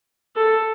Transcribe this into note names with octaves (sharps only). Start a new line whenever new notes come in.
A4